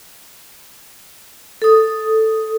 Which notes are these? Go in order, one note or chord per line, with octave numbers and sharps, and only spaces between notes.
A4 D#6